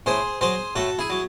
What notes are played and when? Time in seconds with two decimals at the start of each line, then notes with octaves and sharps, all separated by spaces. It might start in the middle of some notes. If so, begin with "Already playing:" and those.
0.06 A2 G#4 C5
0.41 F#3 G#4 C5
0.75 A2 F#4 A4
0.99 E4 G#4
1.10 F#3